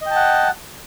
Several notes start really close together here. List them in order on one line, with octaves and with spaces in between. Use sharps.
D#5 G5 A5 F#5